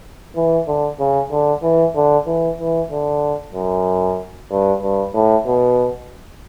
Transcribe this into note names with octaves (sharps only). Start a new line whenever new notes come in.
E3
D3
C#3
D3
E3
D3
E3
E3
D3
F#2
G2
G2
A2
B2